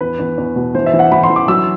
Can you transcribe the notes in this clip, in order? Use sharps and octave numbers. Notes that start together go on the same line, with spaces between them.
E2 B4
E2
E2
B2
E3 C5
E5
E3
F#5
E3 B5
C6
E3
D6
F#3 E6